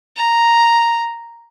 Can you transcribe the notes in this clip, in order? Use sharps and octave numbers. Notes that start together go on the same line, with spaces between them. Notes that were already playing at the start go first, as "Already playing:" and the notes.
A#5